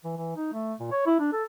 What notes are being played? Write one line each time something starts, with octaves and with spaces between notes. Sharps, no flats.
E3
E3
D#4
A3
A#2
C#5
E4
D4
A4